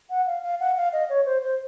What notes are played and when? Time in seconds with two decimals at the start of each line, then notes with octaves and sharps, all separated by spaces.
0.10 F#5
0.27 F5
0.43 F5
0.60 F#5
0.77 F5
0.93 D#5
1.09 C#5
1.26 C5
1.43 C5